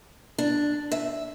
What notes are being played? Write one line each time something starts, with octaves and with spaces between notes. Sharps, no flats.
D4
E5